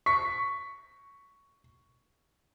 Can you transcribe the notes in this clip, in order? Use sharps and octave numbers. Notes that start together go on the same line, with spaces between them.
C#6 B6